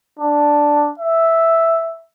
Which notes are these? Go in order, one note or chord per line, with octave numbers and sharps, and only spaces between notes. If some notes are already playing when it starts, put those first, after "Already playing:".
D4
E5